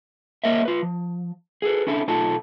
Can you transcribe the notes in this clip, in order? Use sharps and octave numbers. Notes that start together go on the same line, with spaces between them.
A#3 A#4 C#5 D#5 E5
F4 B4
F3
G#4 A4 B4
C#4 D4 E4 A4
B1 D#4 F4 A4 A5